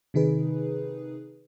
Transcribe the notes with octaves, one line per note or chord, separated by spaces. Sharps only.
C3 D#3 D#4 G#4 B4